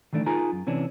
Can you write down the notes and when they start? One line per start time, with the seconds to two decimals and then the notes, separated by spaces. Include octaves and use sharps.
0.13 D#3 E3 A3 D4
0.26 D#4 F4 G#4 A#4 A#5
0.52 F#2
0.67 C3 E3 C#4 D4